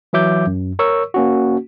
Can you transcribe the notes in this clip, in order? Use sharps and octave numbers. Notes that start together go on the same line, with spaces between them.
E3 F#3 E5 D6 G6
F#2
A#4 C#5 C#6 E6
A#3 C#4 F#4